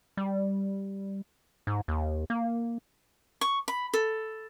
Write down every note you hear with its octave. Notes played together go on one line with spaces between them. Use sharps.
G3
G#2
D#2
A#3
C#6
B5
A4